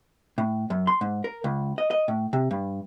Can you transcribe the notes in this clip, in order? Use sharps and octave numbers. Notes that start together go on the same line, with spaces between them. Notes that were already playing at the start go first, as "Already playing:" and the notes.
A2
F#2
C6
G#2
A#4
C#2
D#5
D#5
A2
C3
G2